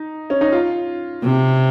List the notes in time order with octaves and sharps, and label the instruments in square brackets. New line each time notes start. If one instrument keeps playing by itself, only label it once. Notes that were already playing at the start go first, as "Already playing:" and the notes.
Already playing: [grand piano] D#4
C#4
D#4
F4
[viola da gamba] C3